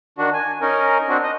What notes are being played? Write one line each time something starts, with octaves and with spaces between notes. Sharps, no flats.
D#3 D4 F#4
G#5
C#4 D#4 A#4
C4 D4 F#4
D#5